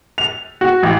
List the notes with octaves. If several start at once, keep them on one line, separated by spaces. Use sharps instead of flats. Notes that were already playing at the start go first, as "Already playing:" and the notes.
F7
F#4
A1